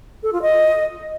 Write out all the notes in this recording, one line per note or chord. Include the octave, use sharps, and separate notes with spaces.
A4
F4
D#5